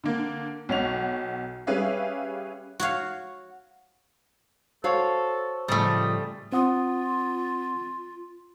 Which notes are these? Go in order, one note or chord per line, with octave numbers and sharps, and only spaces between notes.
D3 A#3
B1 C#5 F#5 F7
G3 C#4 G#4 B4 E5 F5
F#4 C#5 F5
F#4 A4 C5 C#5 F5 A5 C#6
A2 C#3 F3 G3 A3 D#5
C4 F4 F#5 D#6